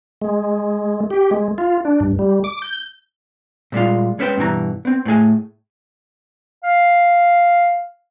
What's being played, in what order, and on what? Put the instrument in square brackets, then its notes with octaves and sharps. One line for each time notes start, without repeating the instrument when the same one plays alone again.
[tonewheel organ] G#3
G4
G#3
F4
D4
G2
G3
D6
G6
[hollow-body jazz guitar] A#2 G3 G#3 F4
G#3 C#4 B4 C5 G5
G2 B2 E3 A#5
B3 C4
A2 A3 G#4 G#5
[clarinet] F5